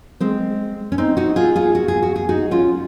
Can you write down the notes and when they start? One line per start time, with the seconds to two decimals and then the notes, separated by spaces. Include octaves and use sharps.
0.20 G#3 C4
0.92 C#4
0.98 C4 D#4
1.17 D#4 F#4
1.36 F4 G#4
1.56 F4 G#4
1.75 F#4
1.88 G#4
2.03 F#4
2.16 G#4
2.29 D#4 F#4
2.51 C#4 F4